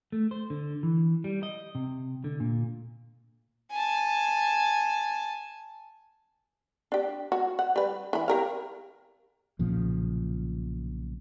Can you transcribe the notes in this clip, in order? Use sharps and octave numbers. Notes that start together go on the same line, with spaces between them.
A3
C5
D3
E3
G3
D#5
C3
D3
A#2
G#5 A5
D4 G4
F#4
F#5
G3 B4
E3 B5
G4 A#4 F5
B1 A#2 C#3 F3